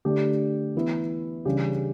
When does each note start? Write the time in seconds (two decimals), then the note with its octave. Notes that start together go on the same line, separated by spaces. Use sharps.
0.05 D3 A3 D4 G4
0.76 E3 B3 E4
1.45 C#3 E3 G3 D4 G4